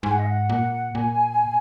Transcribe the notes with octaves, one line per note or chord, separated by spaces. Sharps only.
G#2 G#5
F#5
D#5
F#5
A#2
A#2 G#5